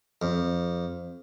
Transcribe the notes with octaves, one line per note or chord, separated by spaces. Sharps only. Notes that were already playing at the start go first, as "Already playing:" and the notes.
F2